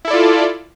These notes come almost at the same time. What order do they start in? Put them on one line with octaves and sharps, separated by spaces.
E4 A4 D5 F4